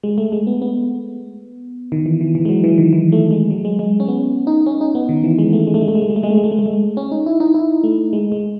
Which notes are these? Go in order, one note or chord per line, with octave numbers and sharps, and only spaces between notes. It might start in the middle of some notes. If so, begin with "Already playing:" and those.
G#3
A3
G#3
B3
B3
D#3
E3
E3
E3
G#3
F#3
E3
D#3
E3
A3
G#3
F#3
G#3
G#3
C#4
B3
D#4
C#4
D#4
B3
D#3
E3
G#3
A3
G#3
A3
G#3
A3
G#3
A3
G#3
A3
G#3
A3
G#3
A3
G#3
A3
G#3
C#4
D#4
E4
D#4
E4
A3
G#3
G#3